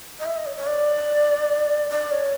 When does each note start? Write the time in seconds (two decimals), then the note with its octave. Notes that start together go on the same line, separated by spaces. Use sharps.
0.20 D#5
0.26 E5
0.37 D#5
0.46 C#5
0.57 C#5
0.67 D5
1.90 D5
2.11 C#5